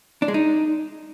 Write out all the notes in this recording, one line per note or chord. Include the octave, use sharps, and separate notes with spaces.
D4
G#3
D#4